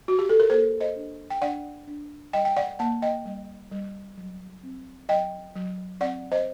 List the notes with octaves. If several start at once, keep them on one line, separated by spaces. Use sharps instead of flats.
F#4
G4
A4
A#4
A#3 A4 C5
C5 D#5
D4
G5
D4 D5 F#5
D4
G3 D#5 G5
G5
D5 F#5
A#3 F#5 A5
D#5 G5
G3
G3
F#3
C4
F#3 D#5 G5
F#3
C4 D5 F#5
C5 D#5